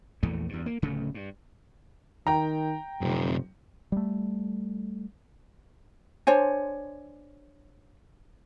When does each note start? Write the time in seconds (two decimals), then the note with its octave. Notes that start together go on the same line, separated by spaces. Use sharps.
0.23 A#1 E2 E3 A3
0.49 E2 G2
0.66 A#3
0.82 D1 C#3 A3
1.14 G2
2.27 D#3 G5 A#5
3.01 F1 F#2 C3
3.92 G3 A3
6.27 D4 C5 C#5 G#5